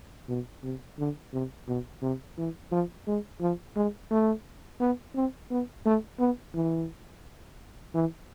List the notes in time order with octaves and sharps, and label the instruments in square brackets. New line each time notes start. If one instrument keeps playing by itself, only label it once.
[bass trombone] B2
C3
D3
C3
B2
C3
E3
F3
G#3
F3
G#3
A3
B3
C4
B3
A3
B3
E3
E3